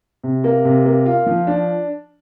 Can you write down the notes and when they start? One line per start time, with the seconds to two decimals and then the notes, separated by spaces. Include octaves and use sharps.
0.24 C3
0.44 A#3
0.65 C3
0.86 A#3
1.06 F4
1.26 F3
1.47 D4